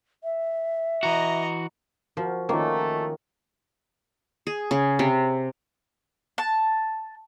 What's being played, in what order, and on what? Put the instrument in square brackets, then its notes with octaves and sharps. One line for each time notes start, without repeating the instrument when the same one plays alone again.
[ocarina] E5
[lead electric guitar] E3 F#4 [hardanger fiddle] D#5 A#5
[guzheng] F3 [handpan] F#4 A#4
[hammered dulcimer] D#3 [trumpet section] A3 [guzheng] A#3 [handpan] C#4 D#4 F4
[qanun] G#4
C#3
C3
[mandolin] A5